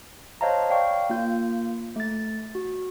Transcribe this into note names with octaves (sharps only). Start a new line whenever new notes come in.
C5 C#5 D#5 F5 A5 A#5
D5 F5 G5 C#6
A#3 F4 G6
A3 A6
F#4